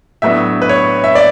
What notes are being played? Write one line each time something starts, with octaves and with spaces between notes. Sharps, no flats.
A2 F#3 B3 D4 E5
B4
C#5
E5
D5